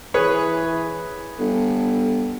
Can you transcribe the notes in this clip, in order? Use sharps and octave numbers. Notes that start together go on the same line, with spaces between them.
E3 G#4 B4 C#5
G1 A4